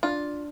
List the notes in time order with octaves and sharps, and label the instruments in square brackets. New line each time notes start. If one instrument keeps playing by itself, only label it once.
[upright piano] D4 [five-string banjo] F4